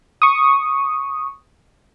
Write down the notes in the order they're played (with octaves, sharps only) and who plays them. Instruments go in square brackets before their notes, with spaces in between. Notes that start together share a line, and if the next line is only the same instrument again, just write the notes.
[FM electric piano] C#6 D#6